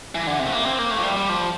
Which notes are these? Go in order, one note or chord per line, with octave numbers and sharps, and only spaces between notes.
E3
D3
C3
A3
A#3
C4
A#3
A3
F3
G3
G3
F3